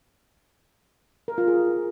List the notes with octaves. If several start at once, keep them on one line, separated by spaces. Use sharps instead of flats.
A#4
F4
G#4